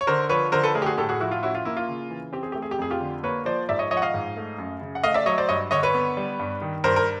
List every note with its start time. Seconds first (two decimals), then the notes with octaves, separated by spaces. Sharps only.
0.01 C#5
0.07 D3 A#4 C5
0.29 F3 B4 C#5
0.52 D3 A#4 C5
0.63 A4 B4
0.75 A3 G#4 A#4
0.82 G4
0.86 F#4 G#4
0.98 A2 G4 A4
1.09 F#4 G#4
1.20 F3 E4 F#4
1.31 F4
1.42 C#4 E4 F#4
1.55 F4
1.65 A#3 E4
1.77 F4
1.88 C#3
2.10 E3
2.33 C4 G4
2.43 G#4
2.52 A3 G4
2.62 G#4
2.71 G4
2.79 F2 G#4
2.91 F4 G4
3.00 D3
3.23 A#3 B4 C#5
3.45 F3 C5 D5
3.69 G#2 D5 E5
3.79 C#5 D#5
3.91 F3 C#5 D#5
3.97 F#5
4.02 D#5 F5
4.14 G#2
4.37 A3
4.58 F#2
4.81 C#3
4.95 F#5
5.03 A3 D#5 F5
5.14 D5 E5
5.26 F#3 C#5 D#5
5.38 C5 D5
5.48 G2 C#5 D#5
5.71 D3 C#5 D#5
5.83 B4 C#5
5.94 B3
6.17 G3
6.40 G2
6.62 D#3
6.84 G2 A#4 C5
6.96 A#4